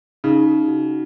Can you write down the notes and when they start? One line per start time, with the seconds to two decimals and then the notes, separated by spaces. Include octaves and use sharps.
0.24 C#3 D#4
0.68 F#4